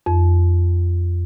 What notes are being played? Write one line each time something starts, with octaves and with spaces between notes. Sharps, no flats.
F2